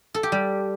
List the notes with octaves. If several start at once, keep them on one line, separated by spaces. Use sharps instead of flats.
A4
G4
G3